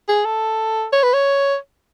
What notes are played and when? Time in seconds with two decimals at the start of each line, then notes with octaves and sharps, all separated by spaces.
0.08 G#4
0.25 A4
0.93 C#5
1.03 B4
1.14 C#5